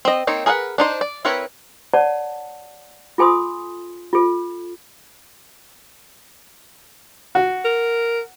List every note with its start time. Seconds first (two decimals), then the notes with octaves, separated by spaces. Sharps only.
0.05 C4 D#5
0.27 A#3 C4 D#4 C#5
0.46 G#4 A#4 B4 F5 F#5
0.78 D4 D#4 C5
1.01 D5
1.25 C4 E4 A#4 B4 C#5
1.94 C#5 D5 F#5 A5
3.18 F4 A4 G#5 C6 D#6
4.13 F4 A4
7.35 F#4
7.65 A#4